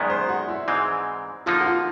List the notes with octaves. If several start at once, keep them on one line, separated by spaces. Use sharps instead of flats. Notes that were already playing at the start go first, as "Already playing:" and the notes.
Already playing: F#2 D#3 G#3 B3 D5
C5
F#4
E4
G#2 E3 G#3 C4
D3 F3 A#3 D#4 F4
F#4
F4